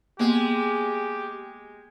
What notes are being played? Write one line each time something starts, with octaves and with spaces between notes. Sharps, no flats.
G#3 A#3 B3 G4